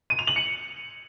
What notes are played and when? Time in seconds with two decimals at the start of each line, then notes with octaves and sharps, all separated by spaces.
0.10 D#7
0.19 F7
0.27 F#7
0.36 C#7